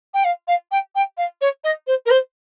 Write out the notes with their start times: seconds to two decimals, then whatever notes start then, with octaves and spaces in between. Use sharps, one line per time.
0.14 G5
0.24 F5
0.47 F5
0.71 G5
0.95 G5
1.17 F5
1.41 C#5
1.64 D#5
1.87 C5
2.06 A#4
2.10 C5